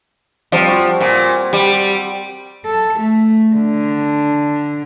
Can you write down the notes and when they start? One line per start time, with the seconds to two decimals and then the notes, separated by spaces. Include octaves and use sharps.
0.52 F3 G3 C4
0.68 F#4
1.01 A#2
1.53 G3
2.66 A4
3.00 A3
3.56 D3